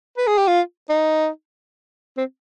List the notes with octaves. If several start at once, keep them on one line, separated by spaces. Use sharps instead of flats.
B4
G#4
G4
F4
D#4
C4